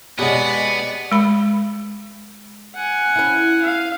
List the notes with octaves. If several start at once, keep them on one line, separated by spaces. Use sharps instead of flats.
B2 G#3 B3 G4 C#5 D5 F#5 G#5
G#3 B5
F#5 G#5
C#4 E4
F5